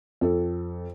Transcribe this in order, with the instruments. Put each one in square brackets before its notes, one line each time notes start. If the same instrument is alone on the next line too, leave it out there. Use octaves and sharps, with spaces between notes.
[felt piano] F2 A4